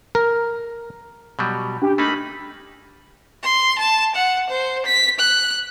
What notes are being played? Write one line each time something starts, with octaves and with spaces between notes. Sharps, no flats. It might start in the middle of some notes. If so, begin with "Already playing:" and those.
A#4
B2 F#3 G3
D4 G4
A3 A#3 D#4 B5
C6
A5
F#5
C5
B6
F#6